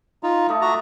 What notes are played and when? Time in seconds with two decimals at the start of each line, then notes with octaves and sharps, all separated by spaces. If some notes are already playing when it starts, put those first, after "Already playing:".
0.23 D#4 F4
0.49 A3 D5 D#5
0.62 F#4 A#5